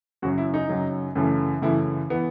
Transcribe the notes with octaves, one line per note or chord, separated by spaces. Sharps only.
F#2 C#3 F#3 F#4
E4
D#4
F#2 C#3 F#3
F#2 C#3 E3 A3
F#2 C#3 E3 A3 E4
E3 B3